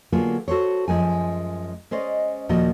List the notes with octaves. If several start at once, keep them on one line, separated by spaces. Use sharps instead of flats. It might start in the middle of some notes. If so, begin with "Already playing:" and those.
D3 F#3 A#3 B3 F4 G#4
F#4 A4 C5 C#5
F#2 F3 G#3 A3 G#5
G#3 C#4 C5 D5 D#5
D#2 A#2 F3 A#3 F#4 D#5